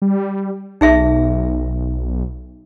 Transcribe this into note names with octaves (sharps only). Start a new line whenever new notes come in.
G3
B1 D#4 G#4 E5